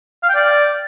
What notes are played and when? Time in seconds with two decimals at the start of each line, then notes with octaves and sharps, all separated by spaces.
0.23 F5
0.29 G5
0.35 D5